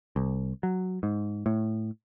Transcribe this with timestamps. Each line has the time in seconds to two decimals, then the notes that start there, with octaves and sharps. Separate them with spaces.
0.16 C2
0.63 F#3
1.03 G#2
1.46 A2